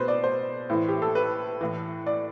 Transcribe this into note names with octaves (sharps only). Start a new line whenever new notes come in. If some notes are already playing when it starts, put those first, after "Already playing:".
Already playing: B2 B4 C5
D5
C5
A2 E3
G4
A4
B4
A2 E3
D5